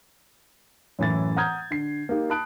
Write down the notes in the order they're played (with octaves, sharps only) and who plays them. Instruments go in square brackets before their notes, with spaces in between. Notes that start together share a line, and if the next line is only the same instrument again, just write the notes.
[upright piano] F#2 A2 E3 E4 A6
F#5 A#5 D#6 F6 G6 G#6
D3 C7
A#3 D#4 G4
A5 B5 D#6 F#6 D7